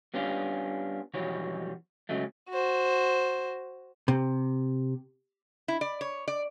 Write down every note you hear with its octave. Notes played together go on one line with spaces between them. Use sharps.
G3 B3 C#4 D4 F4
B1 F2 E3 G3 F#4 C#5
C#3 F#3 G#3 A3
F#4 C5
C3
E4
D5
C#5
D5